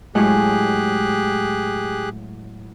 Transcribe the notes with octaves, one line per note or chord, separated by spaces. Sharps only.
A2 F#3 G#3 G4 G#4 F#6